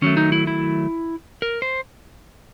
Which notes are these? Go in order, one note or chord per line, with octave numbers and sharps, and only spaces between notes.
D#3 F#3 A3 C#4
D#4
E4
E4
A#4
C5